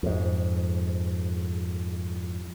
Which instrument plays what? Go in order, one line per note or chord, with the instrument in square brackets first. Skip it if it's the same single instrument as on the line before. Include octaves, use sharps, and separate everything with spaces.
[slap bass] F2 G#2